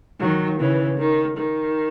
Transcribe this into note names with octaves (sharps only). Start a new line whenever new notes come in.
D#3 F#3
C#3 E3
D#3
D#3